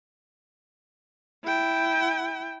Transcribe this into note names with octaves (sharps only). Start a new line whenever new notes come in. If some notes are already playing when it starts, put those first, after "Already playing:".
E4 G5